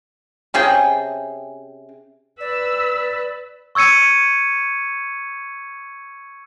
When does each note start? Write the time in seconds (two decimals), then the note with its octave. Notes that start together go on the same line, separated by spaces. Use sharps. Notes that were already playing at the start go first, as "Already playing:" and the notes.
0.54 C3 C#4 G#4 G5
2.40 B4 D5 E6
3.75 C#6 E6 G#6 C#7 D#7